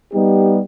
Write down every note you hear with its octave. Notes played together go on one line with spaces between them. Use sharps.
G3 B3 D#4 G4